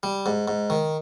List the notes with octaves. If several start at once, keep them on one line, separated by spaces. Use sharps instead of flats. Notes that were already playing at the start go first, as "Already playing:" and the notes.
G3
G#2
G#2
D#3